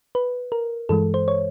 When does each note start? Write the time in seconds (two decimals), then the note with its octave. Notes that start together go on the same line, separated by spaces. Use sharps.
0.15 B4
0.52 A#4
0.89 G2 E3 G#3 A4
1.14 C5
1.28 C#5